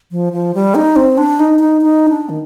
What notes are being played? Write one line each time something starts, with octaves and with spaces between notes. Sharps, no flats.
F3
F3
G3
D#4
C4
D4
D#4
D#4
D#4
D4
D#3